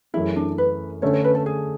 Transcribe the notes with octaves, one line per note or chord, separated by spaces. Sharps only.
F#2 E3 A3 C#4 E4 G#4
D4
B4
D3 A3 C#4 C#5
C#5
B4
A4
G#4